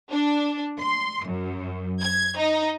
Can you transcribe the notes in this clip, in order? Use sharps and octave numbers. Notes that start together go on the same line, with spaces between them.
D4
C6
F#2
G#6
D#4